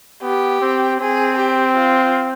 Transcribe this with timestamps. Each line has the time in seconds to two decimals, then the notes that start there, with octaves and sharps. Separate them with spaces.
0.23 B3 G4
0.61 C4
1.00 C4 G#4
1.40 G4
1.77 F4